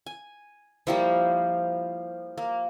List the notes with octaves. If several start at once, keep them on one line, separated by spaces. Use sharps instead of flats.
G#5
F3 G3 A#3 E4
A#3